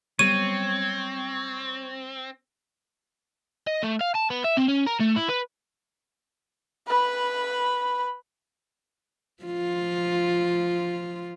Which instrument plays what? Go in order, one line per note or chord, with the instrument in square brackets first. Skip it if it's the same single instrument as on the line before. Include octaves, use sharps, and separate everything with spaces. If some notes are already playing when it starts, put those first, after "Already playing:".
[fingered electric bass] F#3 G3 B3 [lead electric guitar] C4 [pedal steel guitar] C#5 [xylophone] D#7
[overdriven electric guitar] D#5
A3
F5
A5
B3
E5
C4
C#4
A#4
A3
E4
B4
[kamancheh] B4 B5
[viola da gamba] F3 F4